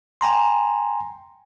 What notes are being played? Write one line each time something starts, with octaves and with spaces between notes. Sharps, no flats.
G5 G#5 A#5 C6